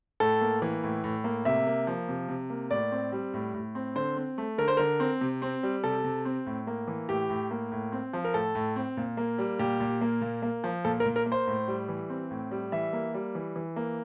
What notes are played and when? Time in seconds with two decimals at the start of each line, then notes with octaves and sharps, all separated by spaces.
0.20 A2 A4
0.41 A#3
0.62 E3
0.83 A2
1.04 A2
1.24 A#3
1.45 C3 E5
1.67 A#3
1.87 F3
2.08 C3
2.29 C3
2.50 A#3
2.71 A2 D5
2.92 C4
3.12 G3
3.34 A2
3.54 A2
3.75 C4
3.96 D3 C5
4.17 C4
4.38 A3
4.58 D3 A#4
4.68 C5
4.77 D3 A#4
5.00 C4
5.21 C3
5.42 C4
5.63 G3
5.84 C3 A4
6.04 C3
6.25 C4
6.46 A2
6.67 A#3
6.88 E3
7.09 A2 G4
7.30 A2
7.51 A#3
7.72 A2
7.92 C4
8.13 F3
8.25 A#4
8.34 A2 A4
8.55 A2
8.76 C4
8.97 A#2
9.17 A#3
9.38 G3
9.59 A#2 G4
9.80 A#2
10.01 A#3
10.21 A#2
10.42 A#3
10.64 F3
10.85 A#2 A4
11.00 A#4
11.06 A#2
11.16 A#4
11.26 A#3
11.32 C5
11.47 A2
11.68 G3
11.89 E3
12.10 C4
12.31 A2
12.51 G3
12.72 E3 E5
12.93 A#3
13.14 G3
13.35 E3
13.56 E3
13.76 A#3